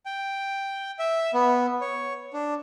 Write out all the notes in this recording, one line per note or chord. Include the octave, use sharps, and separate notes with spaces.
G5
E5
B3
C#5
D4